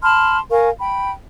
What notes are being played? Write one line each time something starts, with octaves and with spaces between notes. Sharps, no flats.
A5 B5 C6 F6
A#4 F5 G#5 C#6
G5 B5